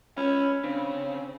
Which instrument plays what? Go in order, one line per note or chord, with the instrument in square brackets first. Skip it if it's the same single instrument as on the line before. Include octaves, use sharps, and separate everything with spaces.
[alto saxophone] C#4 [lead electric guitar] B5
[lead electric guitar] C#3 [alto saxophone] C4 [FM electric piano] D4